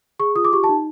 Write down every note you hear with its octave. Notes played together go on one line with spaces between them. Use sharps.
G#4 C#6
F4 D#6
D6
G4 C#6
A5
D#4